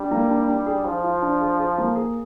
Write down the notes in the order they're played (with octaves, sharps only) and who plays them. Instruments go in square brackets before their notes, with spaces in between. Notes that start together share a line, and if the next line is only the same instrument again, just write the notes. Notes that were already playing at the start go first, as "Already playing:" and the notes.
Already playing: [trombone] G3 [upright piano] D4
[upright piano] A#3
D4
D4
G#4
[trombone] F3 [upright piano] F4
[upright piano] F4
D4
G#4
G#4
A#3
G#4